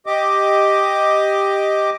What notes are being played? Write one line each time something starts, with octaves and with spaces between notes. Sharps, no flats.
G4 D#5 D6